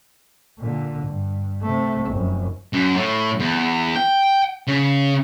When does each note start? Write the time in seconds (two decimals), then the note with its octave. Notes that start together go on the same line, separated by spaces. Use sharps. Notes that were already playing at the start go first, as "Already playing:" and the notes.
0.60 A#2 D3
1.06 G2
1.62 C3 A3
2.10 F1 F#2
2.73 F#2
2.95 A2
3.40 E2
3.95 G5
4.67 C#3